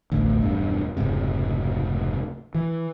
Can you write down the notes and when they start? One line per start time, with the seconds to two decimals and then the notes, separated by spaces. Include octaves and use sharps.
0.12 E1 A1 D2
0.42 E1 G2
0.97 F1 C#2 G#2 C3
2.55 E3